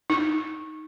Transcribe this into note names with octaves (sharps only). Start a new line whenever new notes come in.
D#4